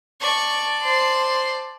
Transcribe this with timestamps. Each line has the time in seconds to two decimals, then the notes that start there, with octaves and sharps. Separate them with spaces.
0.21 D5 A5 C#6
0.82 C5 C6